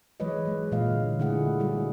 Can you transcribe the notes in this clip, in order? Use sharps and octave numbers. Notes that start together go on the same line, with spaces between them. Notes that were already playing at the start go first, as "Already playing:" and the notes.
E3 F#3 G#3 B4 C#5 D#5
F#3 G#3
A#2 E3 G#3 B4 D#5 F5
D3
D3 A3 E4 G#4 F#5
G3 E4 F#4 G#4